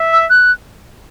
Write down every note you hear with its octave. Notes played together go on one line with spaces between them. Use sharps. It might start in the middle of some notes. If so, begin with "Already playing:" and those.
Already playing: E5
E6
F#6